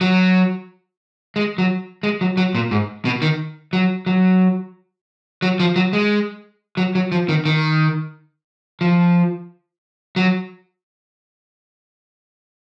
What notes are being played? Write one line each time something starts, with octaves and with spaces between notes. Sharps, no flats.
F#3
G#3
F#3
G#3
F#3
F#3
A#2
G#2
B2
D#3
F#3
F#3
F#3
F3
F#3
G#3
F#3
F#3
F3
D#3
D#3
F3
F#3